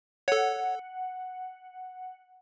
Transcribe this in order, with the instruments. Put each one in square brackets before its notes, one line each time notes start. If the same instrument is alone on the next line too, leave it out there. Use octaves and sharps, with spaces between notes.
[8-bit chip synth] A4 C#5 [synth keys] F#5